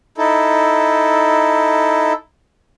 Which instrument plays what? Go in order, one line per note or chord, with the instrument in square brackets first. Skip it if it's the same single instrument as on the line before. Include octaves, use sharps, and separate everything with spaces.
[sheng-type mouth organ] D#4 E4 A4